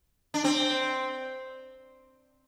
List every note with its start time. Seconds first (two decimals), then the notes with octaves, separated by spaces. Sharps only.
0.34 D4
0.44 C4